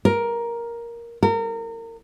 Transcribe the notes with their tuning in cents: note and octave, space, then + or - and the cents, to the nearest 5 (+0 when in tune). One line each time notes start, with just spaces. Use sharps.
A#4 +10
A#4 -30